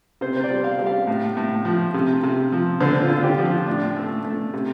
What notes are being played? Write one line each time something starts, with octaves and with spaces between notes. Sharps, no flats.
C3 C5
C5
D5
G3
F5
G3
F5
A2
A2
F3
C3
C3
F3
D3 C5
F4
D3
F4
G4
F3
F4
A2 D4
A3
A3
C3